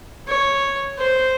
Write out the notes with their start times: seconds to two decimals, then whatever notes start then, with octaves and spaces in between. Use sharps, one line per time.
0.27 C#5
0.98 C5